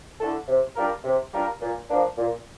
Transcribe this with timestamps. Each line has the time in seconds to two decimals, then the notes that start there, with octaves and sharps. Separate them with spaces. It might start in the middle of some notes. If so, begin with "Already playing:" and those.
0.21 D3 A3 E4 A4
0.48 C3
0.76 G3 D4 F4 A#4
1.04 C3
1.33 G3 D4 F4 A#4
1.61 A#2
1.90 F3 A#3 D4
2.17 A#2